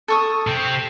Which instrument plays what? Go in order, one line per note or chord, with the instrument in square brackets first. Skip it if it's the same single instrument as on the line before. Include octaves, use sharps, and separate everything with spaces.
[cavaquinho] A4 C#6 D#6
[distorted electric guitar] C3 C4